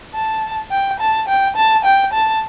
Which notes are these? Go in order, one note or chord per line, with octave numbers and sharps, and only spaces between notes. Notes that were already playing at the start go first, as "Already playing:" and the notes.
A5
G5
A5
G5
A5
G5
A5